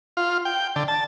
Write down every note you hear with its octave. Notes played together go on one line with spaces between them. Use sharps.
F4
G5
D3
A5